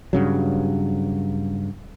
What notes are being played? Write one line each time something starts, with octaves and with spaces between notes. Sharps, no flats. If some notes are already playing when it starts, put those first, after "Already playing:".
G2 C#3 F#3